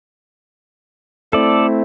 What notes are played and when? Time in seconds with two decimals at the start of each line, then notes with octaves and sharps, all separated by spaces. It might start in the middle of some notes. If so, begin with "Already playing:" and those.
1.33 A3 C4 E4 A4 D5